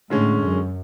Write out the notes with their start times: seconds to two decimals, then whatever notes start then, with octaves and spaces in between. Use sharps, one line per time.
0.10 A2 D3 G#3 C#4
0.43 F#2